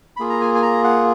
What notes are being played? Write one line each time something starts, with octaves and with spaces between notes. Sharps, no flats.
A#3 F4 G#4 B5
A#5
G#5
G#5
A#5
F#5